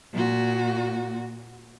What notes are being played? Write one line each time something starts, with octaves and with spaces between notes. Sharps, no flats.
A#2 F#4